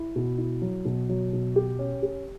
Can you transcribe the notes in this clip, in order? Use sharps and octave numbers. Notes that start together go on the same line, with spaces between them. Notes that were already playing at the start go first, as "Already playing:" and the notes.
Already playing: E4
B2
E4
F#3
B2
F#3
B2
G4
C#4
G4